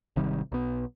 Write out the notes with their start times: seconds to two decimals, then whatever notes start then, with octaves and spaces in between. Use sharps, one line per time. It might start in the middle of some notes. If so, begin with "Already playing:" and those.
0.16 G#1 C3 D#3 G3
0.52 B1 B3